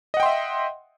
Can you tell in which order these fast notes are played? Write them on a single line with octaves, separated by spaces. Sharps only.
D#5 F#5 G5 C6 E5